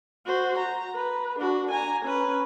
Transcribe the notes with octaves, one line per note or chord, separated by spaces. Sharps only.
F#4 C5
A#5
B4
D4 F#4
G#5 A#5
C#4 B4